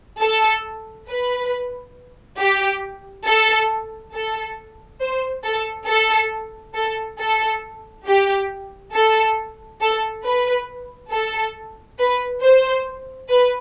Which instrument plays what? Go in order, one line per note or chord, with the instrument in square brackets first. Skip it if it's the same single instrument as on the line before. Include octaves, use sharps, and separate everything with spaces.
[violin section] A4
B4
G4
A4
A4
C5
A4
A4
A4
A4
G4
A4
A4
B4
A4
B4
C5
B4